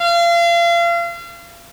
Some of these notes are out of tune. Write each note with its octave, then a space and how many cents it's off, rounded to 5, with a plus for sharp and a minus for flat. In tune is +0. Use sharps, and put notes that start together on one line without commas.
F5 -35